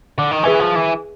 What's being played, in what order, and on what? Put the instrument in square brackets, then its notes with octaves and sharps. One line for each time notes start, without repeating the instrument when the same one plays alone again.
[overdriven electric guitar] D3
D#3
[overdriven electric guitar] E3 [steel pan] G#4 B4 E5 G#5 C#6
[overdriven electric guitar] F3
E3